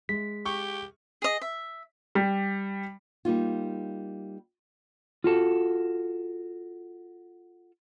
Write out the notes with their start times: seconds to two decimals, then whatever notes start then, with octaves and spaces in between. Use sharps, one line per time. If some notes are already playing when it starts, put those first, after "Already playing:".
0.09 G#3 B6
0.45 G4 C#6
1.22 G#4 D#5
1.41 E5
2.15 G3
3.25 G3 A#3 D#4 F4
5.24 F4 F#4 A4